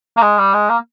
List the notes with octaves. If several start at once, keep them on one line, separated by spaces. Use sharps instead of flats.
A#3
G#3
G3
G#3
A#3